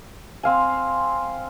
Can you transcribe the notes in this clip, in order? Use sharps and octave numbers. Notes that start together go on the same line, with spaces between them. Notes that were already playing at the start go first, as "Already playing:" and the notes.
C4 F5 G#5